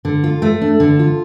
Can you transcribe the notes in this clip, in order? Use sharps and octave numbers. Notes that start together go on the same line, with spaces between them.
D3
F4
A3
D4
D3
F4